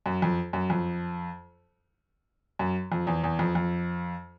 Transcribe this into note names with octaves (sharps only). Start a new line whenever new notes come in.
F#2
F2
F#2
F2
F#2
F2
E2
E2
F2
F2